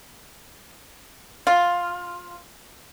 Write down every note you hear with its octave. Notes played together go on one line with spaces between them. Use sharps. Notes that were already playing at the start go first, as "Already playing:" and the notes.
F4